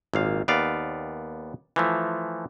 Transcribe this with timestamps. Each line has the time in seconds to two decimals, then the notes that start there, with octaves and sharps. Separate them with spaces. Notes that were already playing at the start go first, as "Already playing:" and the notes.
0.14 G#1 A#2 F5
0.48 D#2 B3 D5 F5
1.76 E3 F3 A3